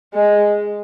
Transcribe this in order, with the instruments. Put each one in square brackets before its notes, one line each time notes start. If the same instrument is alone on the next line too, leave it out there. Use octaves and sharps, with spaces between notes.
[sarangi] G#3